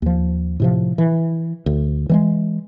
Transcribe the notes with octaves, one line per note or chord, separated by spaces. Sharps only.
D#2 F3
A2 C3 F3
E3
D2
E3 G3 G#3